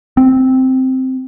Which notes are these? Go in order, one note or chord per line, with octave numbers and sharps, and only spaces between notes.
C4